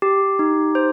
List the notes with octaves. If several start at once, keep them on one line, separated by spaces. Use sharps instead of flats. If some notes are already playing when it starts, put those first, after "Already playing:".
G4
D#4
C5